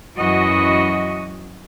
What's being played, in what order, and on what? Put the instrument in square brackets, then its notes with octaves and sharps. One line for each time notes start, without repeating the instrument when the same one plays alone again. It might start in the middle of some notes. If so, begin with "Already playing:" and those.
[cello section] F#2 E3 F#4 D#5